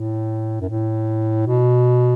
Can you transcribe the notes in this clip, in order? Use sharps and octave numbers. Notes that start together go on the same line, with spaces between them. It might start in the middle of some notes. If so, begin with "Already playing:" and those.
Already playing: A2
F#2
A2
B2